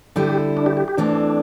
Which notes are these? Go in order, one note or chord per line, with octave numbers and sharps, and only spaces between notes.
D3 G3 E4 G4
D4
G4
G4
G4
E3 A3 C4 D4